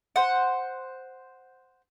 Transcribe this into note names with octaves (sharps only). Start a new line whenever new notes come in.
C5 F#5